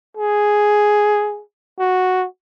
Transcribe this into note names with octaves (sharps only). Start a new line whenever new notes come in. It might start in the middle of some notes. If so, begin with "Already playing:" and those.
G#4
F#4